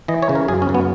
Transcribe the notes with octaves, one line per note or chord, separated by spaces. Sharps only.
E3 D#5
C#5
C#3
A#4
F#2 G#4
C#4
F#2
B3